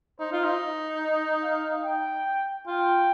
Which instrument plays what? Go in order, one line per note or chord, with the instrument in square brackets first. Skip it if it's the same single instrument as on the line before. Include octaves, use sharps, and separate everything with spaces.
[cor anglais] D#4 [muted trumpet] C5
[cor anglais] F4
D#4
[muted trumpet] D#5
D#5
F5
G5
[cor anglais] F4 [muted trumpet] G5